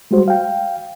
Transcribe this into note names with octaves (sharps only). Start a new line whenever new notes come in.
G3 G#3 F#4 C5
F5 G5